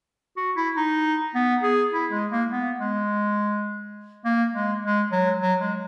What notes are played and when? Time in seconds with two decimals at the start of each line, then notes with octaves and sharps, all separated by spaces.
0.37 F#4
0.56 E4
0.76 D#4
1.34 B3
1.63 G#4
1.92 E4
2.11 G#3
2.31 A#3
2.51 B3
2.79 G#3
4.25 A#3
4.53 G#3
4.82 G#3
5.11 F#3
5.41 F#3
5.60 G#3